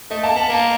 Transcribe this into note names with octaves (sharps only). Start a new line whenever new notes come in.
A3 D#5
A#3 A5
B3 A5
A#3 A5